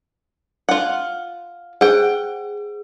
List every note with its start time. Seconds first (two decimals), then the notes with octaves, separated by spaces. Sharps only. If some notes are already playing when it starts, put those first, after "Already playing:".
0.69 F4 F#5
1.81 G#4 F#5 G5